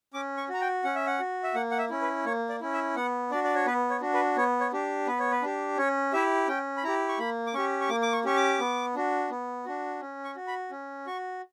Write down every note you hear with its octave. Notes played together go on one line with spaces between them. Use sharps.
C#4 D6
C#6
F#4 A#5
G5
C#4 F#5
E5
F#5
F#4
E5
A#3 F#5
F#5
E5
C#4 E4
B4
A#3 C#5
D5
C#4 E4
E5
B3 F#5
D4 F#4 D5
D5
C#5
B3 B4
C#5
D4 F#4
B4
B3 C#5
C#5
D4 G4
B3 B4
C#5
B4
D4 G4
C#4 C#5
E4 G4 E5
C#4 G5
B5
E4 G4 A#5
C#6
A#3 B5
D6
C#4 G4 C#6
C#6
A#3 D6
D6
C#6
C#4 G4 C#6
D6
B3
D4 F#4
B3
D4 F#4
C#4
C#6
F#4
B5
C#4
F#4 C#6